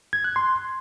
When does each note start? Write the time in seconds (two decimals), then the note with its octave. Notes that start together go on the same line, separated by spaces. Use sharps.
0.13 G#6
0.24 F#6
0.36 C6